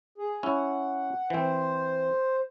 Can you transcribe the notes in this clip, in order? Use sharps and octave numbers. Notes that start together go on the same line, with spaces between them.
G#4
C#4 E4 F#5
E3 C4 C5